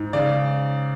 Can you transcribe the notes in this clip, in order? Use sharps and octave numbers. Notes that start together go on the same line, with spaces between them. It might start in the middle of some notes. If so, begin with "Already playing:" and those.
Already playing: G#2
C#3 D5